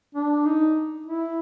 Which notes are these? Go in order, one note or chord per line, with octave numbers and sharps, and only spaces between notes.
D4
D#4
E4